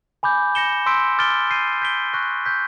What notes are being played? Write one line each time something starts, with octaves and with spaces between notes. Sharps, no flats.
G#5 B5 D6 G6
G6 A#6 C#7 E7 G7
C6 E6 G6 B6 D7
D6 F6 A6 D7 G7
G6 C7 D#7
G6 B6 D7 G7
C#6 F#6 A#6
C#6 E6 G6 B6